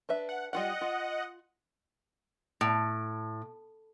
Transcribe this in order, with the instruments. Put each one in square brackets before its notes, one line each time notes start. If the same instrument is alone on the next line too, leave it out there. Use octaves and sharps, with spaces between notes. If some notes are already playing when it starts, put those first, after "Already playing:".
[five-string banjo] D4 B4 E5
[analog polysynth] F#5
[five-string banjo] G3 F4 G5 [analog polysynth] D#5 F#5
[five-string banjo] F4
[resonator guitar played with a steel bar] A2